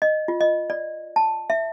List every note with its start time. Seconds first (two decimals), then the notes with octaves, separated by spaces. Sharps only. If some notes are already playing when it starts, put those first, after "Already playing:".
0.02 D#5
0.28 F4
0.41 D#5
0.70 D5
1.16 A5
1.50 E5